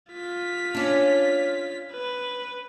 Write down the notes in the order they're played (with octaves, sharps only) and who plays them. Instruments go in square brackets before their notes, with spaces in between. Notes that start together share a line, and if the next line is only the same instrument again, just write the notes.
[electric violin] F4 B6
[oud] C#4 D4
[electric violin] B4